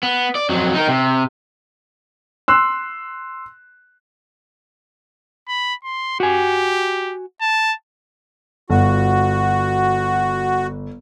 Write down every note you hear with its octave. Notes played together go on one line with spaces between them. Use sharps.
B3
D5
F2 F#3
D#4 A#4
C3
C6 E6 F#6
B5
C6
F#4 G4 G#5
A5
G1 F#4